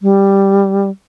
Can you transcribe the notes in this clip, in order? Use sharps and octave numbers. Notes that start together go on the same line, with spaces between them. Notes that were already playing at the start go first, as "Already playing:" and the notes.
G3